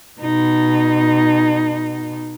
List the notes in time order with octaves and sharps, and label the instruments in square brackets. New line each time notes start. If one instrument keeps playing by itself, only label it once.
[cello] B2 D#4